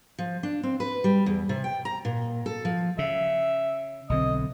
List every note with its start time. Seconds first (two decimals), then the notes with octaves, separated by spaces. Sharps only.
0.19 F3
0.43 D4
0.63 C4
0.80 B4
1.04 G3
1.26 E2
1.49 C3
1.64 G5
1.85 A#5
2.05 A#2
2.46 A4
2.65 F3
2.99 C#3 E5
4.10 B1 D3 C4 D#5